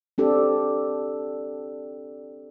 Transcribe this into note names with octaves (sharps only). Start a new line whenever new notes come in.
C4 D4 G4 A4